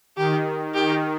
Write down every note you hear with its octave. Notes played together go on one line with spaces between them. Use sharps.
D#3 G4
D#3 G4